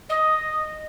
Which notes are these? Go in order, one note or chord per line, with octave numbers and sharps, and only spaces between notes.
D#5